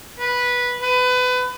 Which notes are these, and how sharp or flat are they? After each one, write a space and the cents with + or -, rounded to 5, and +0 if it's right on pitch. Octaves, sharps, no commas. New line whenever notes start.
B4 -10
B4 +25